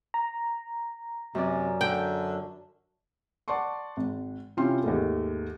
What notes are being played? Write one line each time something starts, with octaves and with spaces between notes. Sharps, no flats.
A#5
F#2 C3 D5
D3 G5
D5 F#5 A5 C6 C#6
G#1
C3 C#4 E4 F4 G5 C6
D#2 G#2 A3